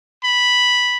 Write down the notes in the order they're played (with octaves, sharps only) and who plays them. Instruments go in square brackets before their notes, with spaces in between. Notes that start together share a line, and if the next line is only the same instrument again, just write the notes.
[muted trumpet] B5